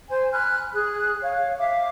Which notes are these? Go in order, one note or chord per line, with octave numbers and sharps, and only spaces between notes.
C5 G#5
G#5 B5 F6 F#6
G#4 F#6
C#5 F5
E5 F5 D6